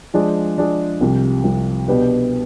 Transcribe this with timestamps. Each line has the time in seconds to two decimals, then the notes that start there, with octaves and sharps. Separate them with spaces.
0.14 F3 G#3 D4 G#4
0.58 F3 G#3 D4 G#4
1.01 C2 C3 F3
1.43 C2 C3 F3
1.88 B2 B3 D4 G4 B4